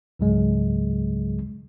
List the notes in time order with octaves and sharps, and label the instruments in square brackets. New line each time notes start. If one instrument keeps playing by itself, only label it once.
[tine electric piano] C#2 G#2 C#3 F#3 G#3